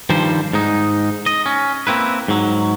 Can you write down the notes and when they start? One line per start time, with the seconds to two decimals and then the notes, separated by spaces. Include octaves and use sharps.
0.10 G2 D#3 F3 G3 C5
0.53 G#2 D#4
1.26 D#5
1.46 C#4
1.87 A#3 C4 E4 B4
2.28 G#2 F#3